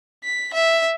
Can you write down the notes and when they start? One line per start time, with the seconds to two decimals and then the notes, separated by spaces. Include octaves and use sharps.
0.24 B6
0.54 E5